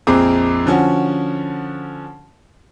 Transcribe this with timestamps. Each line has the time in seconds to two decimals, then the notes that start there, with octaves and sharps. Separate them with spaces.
0.07 A#1 F2 C4 G#4 A#5 D6
0.66 D3 F3 C#4 F#4